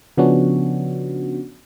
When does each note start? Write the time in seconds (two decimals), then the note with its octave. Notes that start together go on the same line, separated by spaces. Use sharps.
0.17 C#3 F3 B3 C#4 D4 F#4